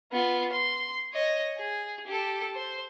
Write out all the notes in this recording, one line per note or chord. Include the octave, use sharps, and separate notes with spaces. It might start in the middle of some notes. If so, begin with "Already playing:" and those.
B3 F4
C6
C#5 D#5
G#4
G4 A4
C5